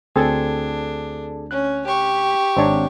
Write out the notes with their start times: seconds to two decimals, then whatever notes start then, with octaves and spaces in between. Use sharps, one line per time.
0.16 D2 C4 D4 G#4 A4 A5 G#6
1.51 C#4 F#6
1.86 G4 C#6
2.57 G#1 C4 D4 C#5 A#5